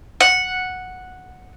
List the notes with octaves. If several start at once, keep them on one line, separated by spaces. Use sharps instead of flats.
F#5